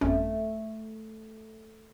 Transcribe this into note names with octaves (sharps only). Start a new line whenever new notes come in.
G1 F2 A3 C#4